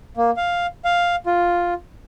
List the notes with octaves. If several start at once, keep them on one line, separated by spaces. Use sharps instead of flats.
A#3
F5
F5
F4